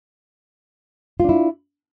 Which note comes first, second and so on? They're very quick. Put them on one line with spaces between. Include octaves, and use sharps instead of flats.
F4 D4 E4